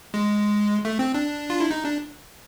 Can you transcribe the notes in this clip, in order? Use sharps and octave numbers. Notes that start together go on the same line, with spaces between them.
G#3
A3
C4
D4
F4
E4
D#4
D4